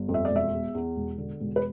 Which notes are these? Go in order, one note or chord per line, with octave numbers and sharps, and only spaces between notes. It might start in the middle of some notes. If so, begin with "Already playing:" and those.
Already playing: G1
F2
E5
D5
E1
E5
E2
E2
E1
D3
E1
B4